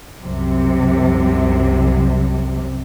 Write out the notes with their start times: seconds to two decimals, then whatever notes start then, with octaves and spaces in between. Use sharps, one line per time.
0.22 C2 F#2 C3